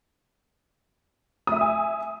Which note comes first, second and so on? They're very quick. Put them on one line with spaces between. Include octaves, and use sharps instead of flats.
D#6 E5 E6 G#5